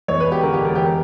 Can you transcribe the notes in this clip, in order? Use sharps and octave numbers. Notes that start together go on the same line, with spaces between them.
E2 C#5
B4
E1
G4
D3 A#4
G4
E1 A#4
E2 G4
A#4